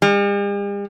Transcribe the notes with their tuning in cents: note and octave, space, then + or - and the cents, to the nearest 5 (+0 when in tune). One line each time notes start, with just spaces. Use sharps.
G3 +45